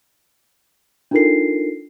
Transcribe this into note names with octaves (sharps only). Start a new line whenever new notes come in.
D4 D#4 F4 A4 A#4 C7